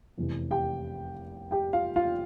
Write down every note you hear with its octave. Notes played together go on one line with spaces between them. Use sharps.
F1 E2 C3 E3
G4 G5
G4 G5
F4 F5
F4 F5